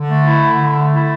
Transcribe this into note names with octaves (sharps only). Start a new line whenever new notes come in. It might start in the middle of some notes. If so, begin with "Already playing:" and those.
Already playing: D3
A3
E4
D3
D3
A3
E4